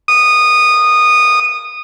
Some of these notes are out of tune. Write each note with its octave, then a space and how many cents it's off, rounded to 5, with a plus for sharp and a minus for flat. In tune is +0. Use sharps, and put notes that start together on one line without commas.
D#6 -15